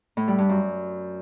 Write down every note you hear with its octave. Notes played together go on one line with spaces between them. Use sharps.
A2
G3
G2
F#2